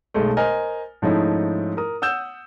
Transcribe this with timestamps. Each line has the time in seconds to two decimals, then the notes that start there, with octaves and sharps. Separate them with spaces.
0.14 B1 G#3 A3
0.37 A#4 C5 D#5 G#5 A#5 F6
1.02 G#2 F3 A3 C#4 D#4 E4
1.77 A#4 D#6
2.02 F#5 D#6 E6 G6 E7